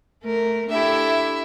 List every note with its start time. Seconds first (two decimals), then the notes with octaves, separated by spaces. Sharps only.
0.23 A3 A#4
0.70 D4 E4 G4 A4 E5